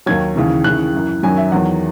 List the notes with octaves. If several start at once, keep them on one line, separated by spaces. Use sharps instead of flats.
D#2 D#3 F#3 G#6
D#2 C#3 E3
D#2 C#3 E3 F#6
F#2 E3
F#2 D#3 F#3 G#5
E5
E2 D#3 F#3 F#5